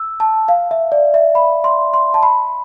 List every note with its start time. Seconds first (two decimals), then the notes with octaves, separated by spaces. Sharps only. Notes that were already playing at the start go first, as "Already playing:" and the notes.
Already playing: E6
0.20 A5
0.48 F5
0.71 E5
0.92 D5
1.14 E5
1.35 B5
1.64 C6
1.94 C6
2.14 A5
2.23 B5